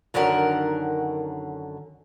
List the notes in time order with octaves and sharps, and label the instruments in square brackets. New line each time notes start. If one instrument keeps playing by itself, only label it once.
[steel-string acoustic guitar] F#2 D3 D#3 C#4 A#4 F#5